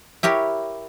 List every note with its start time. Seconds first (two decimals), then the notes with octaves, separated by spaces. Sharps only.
0.23 E4 G4 A#4 C#5